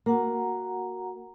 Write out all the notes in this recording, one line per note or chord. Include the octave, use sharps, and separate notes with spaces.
A#3 F#4 F#5 A#5